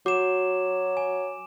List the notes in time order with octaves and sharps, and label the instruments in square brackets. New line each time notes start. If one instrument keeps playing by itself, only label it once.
[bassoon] F#3 [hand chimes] F#4 [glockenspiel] D6 E7
[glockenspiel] G#5